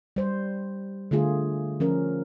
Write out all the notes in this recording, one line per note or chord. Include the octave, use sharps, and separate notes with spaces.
G3 C5
D3 A3 F4 G#4
F3 C#4 A#4